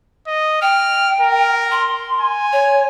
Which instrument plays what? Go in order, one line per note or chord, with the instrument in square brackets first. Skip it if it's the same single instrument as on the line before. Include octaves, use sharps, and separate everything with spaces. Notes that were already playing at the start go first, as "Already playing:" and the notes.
[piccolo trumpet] D#5
[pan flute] G5 [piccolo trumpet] F6
[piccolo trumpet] A#4
[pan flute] C6
[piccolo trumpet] G#5
[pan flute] C#5